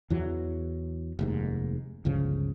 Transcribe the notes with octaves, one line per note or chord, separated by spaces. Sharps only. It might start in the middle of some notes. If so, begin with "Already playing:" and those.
E2 E3 F#3
F1 D#2 G#2
G1 C#2 C#3 F3